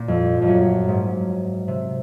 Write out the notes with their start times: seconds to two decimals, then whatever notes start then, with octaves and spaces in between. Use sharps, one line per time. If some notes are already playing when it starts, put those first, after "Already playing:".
Already playing: A#2
0.08 F2
0.42 F2
0.47 F#2
0.88 G#2
1.68 C3